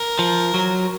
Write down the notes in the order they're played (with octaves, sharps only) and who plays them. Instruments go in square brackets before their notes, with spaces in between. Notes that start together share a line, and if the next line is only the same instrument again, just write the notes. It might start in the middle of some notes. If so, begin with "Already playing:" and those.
Already playing: [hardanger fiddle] A#4
[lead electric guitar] F3
F#3